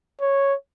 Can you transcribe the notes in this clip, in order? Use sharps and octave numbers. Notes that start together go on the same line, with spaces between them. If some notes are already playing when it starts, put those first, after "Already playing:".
C#5